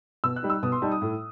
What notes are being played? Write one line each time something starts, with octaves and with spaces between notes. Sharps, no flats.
B2 E6
F#6
G3 D#4
E6
B2 D#6
C6
G3 D#4 A5
D#6
A2